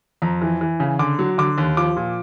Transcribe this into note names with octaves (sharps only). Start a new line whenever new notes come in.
F2 A#5
E3
E3
C#3
D3 D6
F#3
D3 D6
D#2
F3 D6
A#2